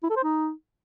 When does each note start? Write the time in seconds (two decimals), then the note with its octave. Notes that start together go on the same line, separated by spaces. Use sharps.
0.03 E4
0.10 A4
0.17 C5
0.23 D#4